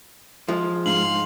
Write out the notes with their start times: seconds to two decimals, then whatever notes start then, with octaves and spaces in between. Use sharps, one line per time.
0.48 F3 G#3
0.86 G#2 F5 C6 F#7